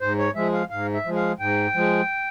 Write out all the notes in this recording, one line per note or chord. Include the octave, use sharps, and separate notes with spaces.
G#2 C5
C#5
F3 G#3 E5
F5
G#2 F5
E5
F3 G#3
F5
G#2 G5
F3 G#3